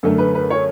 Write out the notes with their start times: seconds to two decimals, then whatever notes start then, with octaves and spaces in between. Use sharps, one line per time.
0.03 F#2 D3 A3 A4
0.18 B4
0.35 B4
0.50 C#5